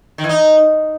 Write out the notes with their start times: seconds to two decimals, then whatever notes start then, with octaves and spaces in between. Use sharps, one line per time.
0.18 D#3
0.24 E3
0.29 D#4